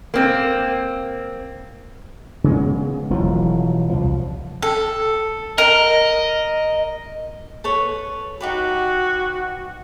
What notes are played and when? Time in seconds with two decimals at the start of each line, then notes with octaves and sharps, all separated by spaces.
0.14 A#3 C4
2.44 C#3 G#3 B3
3.10 E1 E2 F3 F#3
3.90 C2 F3
4.62 A4
5.58 A#4 D#5
7.64 A4 B4 C#5
8.41 D#4 F#4 G4 B4